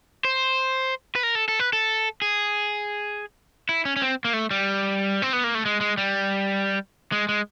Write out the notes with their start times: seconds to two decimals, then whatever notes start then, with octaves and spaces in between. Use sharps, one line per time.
0.25 C5
1.15 B4
1.23 A#4
1.35 A4
1.48 A4
1.59 B4
1.73 A4
2.22 G#4
3.69 E4
3.85 C#4
3.96 C#4
4.02 C4
4.25 A#3
4.33 A3
4.51 G3
5.22 C4
5.33 B3
5.44 A#3
5.55 A3
5.65 G#3
5.81 G#3
5.98 G3
7.12 G#3
7.29 G#3